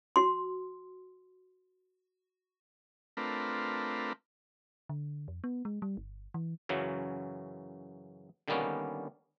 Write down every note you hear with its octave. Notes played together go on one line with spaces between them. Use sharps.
F#4 C6
A3 C4 D4 F4 A#4 B4
D3
F2
B3
G#3
G3
G1
E3
F#2 C#3 E3 F#3
D3 D#3 G3 A#3 B3 C#4